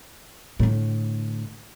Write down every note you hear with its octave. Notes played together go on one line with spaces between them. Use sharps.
A2 D3